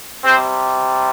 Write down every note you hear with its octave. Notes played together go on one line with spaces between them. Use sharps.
C3 G3 C4 C5